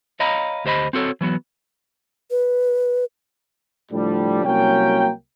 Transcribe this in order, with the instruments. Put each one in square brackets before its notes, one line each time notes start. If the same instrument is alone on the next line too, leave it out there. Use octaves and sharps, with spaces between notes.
[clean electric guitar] C#5 D#5 F5 A#5 B5
D2 G4 C5 D#5 B5
C4 F#4 A4 C#5
E3 F#3 B3 F#4
[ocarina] B4
[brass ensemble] A2 D3 F3 G3
C2 F#3 A#3 C#4 G5